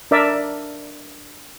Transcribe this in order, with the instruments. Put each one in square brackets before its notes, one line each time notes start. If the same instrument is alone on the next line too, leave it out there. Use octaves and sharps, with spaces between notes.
[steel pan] D4 A#4 D5 E5